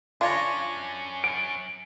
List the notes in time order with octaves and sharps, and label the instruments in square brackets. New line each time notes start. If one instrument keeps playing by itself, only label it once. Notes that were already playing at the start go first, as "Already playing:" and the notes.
[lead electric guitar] F#2 C#4 [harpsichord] D4 C#5 A#5 [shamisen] F4
[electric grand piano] D7